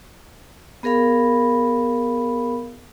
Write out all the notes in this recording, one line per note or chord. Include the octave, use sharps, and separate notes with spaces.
B3 G#4 A#4 F5 B5